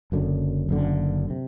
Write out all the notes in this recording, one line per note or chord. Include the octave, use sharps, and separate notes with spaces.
F#1 F#2 D3
F#1 F#2 D3
C3